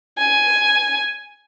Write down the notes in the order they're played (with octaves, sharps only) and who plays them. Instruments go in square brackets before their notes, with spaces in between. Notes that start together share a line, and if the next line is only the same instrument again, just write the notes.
[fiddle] G#5